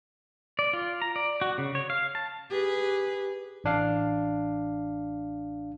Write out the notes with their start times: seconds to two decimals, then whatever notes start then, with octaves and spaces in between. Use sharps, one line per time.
0.59 D5
0.73 F4
1.02 A#5
1.16 D5
1.42 F#4
1.58 C#3
1.75 C#5
1.90 F5
2.15 A5
2.50 G4 G#4 B4
3.64 A1 D4 F5